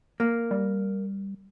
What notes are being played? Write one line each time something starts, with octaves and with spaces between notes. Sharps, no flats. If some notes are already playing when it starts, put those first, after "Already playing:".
A#3
G3